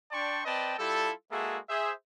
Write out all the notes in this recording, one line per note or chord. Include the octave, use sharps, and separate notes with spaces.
D4 D5 G5 A5 C6 C#6
C4 B4 D5 D#5 G5 A5
G3 E4 F4 G4 A4
G#3 A#3 F#4 G#4 A4 E5
G#4 C5 E5